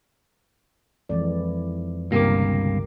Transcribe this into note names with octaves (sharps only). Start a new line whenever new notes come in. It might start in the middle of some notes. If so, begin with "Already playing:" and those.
F2 E3 G#3 D5
G1 C#2 G2 C3 A#3 G4 A#4 D6